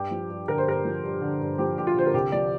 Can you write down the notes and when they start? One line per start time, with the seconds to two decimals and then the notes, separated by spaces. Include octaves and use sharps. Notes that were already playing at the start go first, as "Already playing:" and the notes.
Already playing: G2 G4
0.11 F3
0.30 G2
0.48 D3 A#4
0.58 C5
0.66 G2 A#4
0.85 F3
1.04 G2
1.22 D3
1.41 G2
1.58 F3 G4
1.77 G2 G4
1.87 F4
1.96 D3 C5
2.07 A#4
2.14 C2 G4
2.32 F3 D5